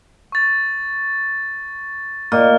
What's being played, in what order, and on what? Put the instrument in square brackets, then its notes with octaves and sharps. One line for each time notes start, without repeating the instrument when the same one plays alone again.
[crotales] C#6 A6
[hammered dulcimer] A#2 [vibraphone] D#5 [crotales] F6